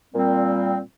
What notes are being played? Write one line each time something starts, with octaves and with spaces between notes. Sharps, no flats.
A#2 G3 C4